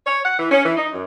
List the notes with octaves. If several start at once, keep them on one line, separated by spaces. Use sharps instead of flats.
C#5
F#5
E3
C#4
E3
D#4
F#2